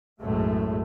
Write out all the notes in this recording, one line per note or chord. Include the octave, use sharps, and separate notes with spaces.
B1 F#2 A2 G#3 A3